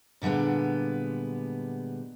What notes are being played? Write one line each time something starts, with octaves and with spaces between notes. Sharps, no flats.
A#2 D3 G3 G#3 B3